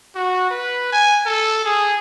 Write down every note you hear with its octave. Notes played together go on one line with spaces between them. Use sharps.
F#4
B4
G#5
A4
G#4